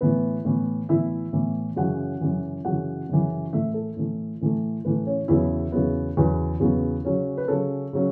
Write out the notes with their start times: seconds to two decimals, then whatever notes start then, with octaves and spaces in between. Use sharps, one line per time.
0.01 A2 E3 B3 B4
0.45 A2 E3 B3
0.89 A2 E3 B3 E4 E5
1.33 A2 E3 B3
1.76 F#2 C#3 E3 F#4 F#5
2.21 F#2 C#3 E3
2.65 F#2 C#3 E3 F#4 F#5
3.09 F#2 C#3 E3
3.53 A2 E3 A3 E4 E5
3.74 A4
3.97 A2 E3 A3
4.41 A2 E3 A3
4.85 A2 E3 A3 B4
5.07 C#4 C#5
5.28 E2 C#3 F#3 B3 E4 E5
5.72 E2 C#3 F#3 B3
6.17 E2 C#3 F#3 B3 B4
6.60 E2 C#3 F#3 B3
7.05 C#3 F#3 C#4
7.37 B4
7.48 C#3 F#3 C#4 A4
7.93 C#3 F#3 C#4